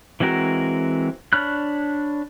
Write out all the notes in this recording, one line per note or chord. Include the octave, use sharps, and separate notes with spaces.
E3 G#3 C4 F#4 A#4
D4 C#5 B5 F6 F#6